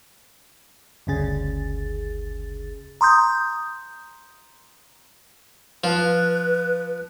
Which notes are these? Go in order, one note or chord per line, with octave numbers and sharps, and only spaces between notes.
G1 D2 C#3 G#4 A6
A#5 C6 D#6 G6
F3 B4